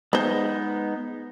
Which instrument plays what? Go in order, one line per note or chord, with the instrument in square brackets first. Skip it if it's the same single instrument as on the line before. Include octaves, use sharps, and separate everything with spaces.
[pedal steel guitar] G#3 B3 D#4 [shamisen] B4 C5